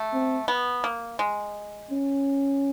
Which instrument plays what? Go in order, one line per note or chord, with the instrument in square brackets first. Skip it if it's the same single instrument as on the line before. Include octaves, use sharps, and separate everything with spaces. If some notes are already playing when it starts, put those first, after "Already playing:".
Already playing: [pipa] A3
[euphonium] C4
[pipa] B3
A#3
G#3
[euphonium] C#4